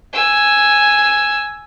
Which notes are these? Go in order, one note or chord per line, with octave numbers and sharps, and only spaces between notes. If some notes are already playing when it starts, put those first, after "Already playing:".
G#5 E6